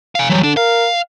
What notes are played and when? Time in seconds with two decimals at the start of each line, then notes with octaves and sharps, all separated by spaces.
0.15 F5 G#5
0.29 E3 F#3 G3
0.43 D3 D4
0.57 A#4 F5